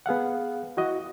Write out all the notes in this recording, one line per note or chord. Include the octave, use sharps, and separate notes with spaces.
B3 G#4 F5 F#5
E4 F#4 D#5